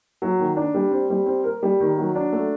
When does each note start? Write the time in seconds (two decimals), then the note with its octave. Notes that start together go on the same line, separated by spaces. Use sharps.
0.22 F#3
0.39 D#3
0.56 D4
0.74 G3
0.91 C4
1.10 G3
1.26 C4
1.44 A#4
1.63 G3
1.80 D#3
1.98 F#3
2.15 D4
2.32 A3